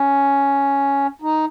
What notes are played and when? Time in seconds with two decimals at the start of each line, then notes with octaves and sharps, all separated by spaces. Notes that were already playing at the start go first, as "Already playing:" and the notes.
Already playing: C#4
1.22 D#4